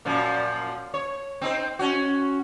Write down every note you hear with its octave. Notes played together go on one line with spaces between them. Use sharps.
F#2 A#2 F3
C#5
C4 D#4 C5
C#4 F#4